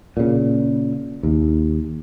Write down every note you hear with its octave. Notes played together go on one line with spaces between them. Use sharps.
A#2 C#3
D#2